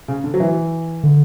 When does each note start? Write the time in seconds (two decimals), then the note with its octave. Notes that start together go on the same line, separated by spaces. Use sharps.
0.08 C#3
0.24 D3
0.34 F#3
0.40 E3
1.03 D3